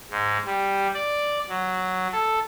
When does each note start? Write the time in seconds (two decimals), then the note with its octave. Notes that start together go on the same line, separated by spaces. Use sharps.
0.11 G#2
0.46 G3
0.95 D5
1.49 F#3
2.13 A4